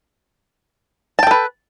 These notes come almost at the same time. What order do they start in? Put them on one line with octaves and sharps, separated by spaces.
A5 G5 A4 B4